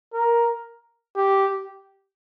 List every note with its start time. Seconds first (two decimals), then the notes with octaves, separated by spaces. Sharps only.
0.14 A#4
1.16 G4